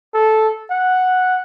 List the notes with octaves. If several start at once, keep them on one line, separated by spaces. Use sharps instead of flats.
A4
F#5